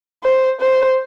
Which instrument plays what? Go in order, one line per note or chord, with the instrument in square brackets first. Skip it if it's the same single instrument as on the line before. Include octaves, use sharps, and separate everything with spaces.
[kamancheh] C5
C5